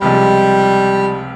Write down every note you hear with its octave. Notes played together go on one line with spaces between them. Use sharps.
C#2 C3 F3 G3 G#3